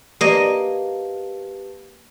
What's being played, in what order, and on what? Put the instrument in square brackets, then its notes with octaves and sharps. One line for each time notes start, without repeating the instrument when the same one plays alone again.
[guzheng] A#3 D#5 [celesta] G4 B4 A5